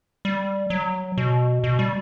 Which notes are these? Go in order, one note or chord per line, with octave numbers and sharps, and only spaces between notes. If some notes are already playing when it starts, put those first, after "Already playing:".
G3
F#3
B2
B2
G3